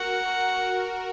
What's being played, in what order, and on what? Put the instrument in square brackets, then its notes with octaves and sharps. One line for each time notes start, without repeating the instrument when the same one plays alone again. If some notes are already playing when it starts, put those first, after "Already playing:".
Already playing: [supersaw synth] F#4 A#4 [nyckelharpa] F#5